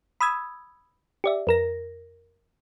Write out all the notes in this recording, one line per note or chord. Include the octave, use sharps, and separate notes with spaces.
B5 D#6 E6 G#6
G4 D5 E5
F2 A#4 A#6